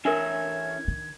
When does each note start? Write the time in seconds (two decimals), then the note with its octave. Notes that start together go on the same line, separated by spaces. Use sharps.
0.05 E3 C#4 D4 A#4 E5 G#6
0.88 D#3